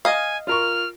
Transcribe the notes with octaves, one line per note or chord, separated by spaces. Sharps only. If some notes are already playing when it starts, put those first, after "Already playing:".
D#5 F5 G#5
F4 A#4 C#6 F6